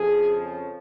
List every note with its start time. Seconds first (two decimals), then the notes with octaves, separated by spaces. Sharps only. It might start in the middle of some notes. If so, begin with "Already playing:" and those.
Already playing: F2 C#3 F3 G#4
0.39 C#4